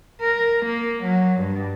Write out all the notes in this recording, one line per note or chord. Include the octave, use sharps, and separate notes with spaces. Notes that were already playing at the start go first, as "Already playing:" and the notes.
A#4
A#3
F#3
G2